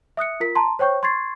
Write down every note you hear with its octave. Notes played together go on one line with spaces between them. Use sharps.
E5 D#6 F#6 C#7
F4 A#4 B6
A5 A#5 C6
C5 C#5 G5 C#6 G6
C6 C#6 G#6 A6 C7